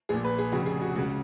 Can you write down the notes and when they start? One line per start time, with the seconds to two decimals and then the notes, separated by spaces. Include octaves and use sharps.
0.09 A#1 A#2 G#4
0.24 B4
0.38 G#4
0.52 F1 F2 C#3 F#4
0.66 G#4
0.81 F#4
0.95 C#2 C#3 F#4